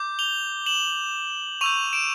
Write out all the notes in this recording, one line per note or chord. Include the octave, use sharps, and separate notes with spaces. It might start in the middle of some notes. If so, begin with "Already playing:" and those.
Already playing: D6 G6
F7 G7
E7 F#7
C#6 E6 G6 D#7 F7
D7 E7